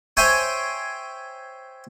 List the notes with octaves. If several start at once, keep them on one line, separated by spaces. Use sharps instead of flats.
C5 C#5 E5 G5 G#5